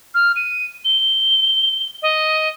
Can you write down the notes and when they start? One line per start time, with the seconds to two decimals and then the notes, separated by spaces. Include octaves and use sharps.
0.15 F6
0.36 D#7
0.85 G7
2.02 D#5